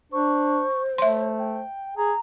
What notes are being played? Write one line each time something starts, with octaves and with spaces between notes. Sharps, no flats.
D4 C5 C#6
A3 C#5 E5 C6
G5
G#4 A#5